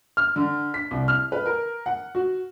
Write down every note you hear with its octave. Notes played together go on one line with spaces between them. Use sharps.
F6
D3
B6
C2
F6
B4
A#4
F#5
F#4